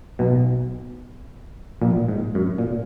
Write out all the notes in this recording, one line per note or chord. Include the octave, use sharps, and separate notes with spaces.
B1 B2
A#1 A#2
G#2
F#2
A#2